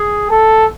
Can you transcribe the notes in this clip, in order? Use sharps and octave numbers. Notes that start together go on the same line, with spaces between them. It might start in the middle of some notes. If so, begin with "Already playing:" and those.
Already playing: G#4
A4